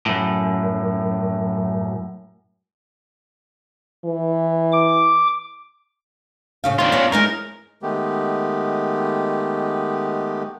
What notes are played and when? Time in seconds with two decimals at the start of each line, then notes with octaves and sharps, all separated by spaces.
0.06 F#2 A2
4.05 E3
4.72 D6
6.64 A2 C#3 F5
6.78 D#2 C4 D4 F4
6.92 B3 C#4
7.12 E3 G#3 D#4 A#4
7.83 D#3 G#3 A3 B3 G4